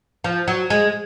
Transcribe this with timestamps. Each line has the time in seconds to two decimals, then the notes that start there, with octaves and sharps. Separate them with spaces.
0.24 F3
0.48 F#3
0.70 G#3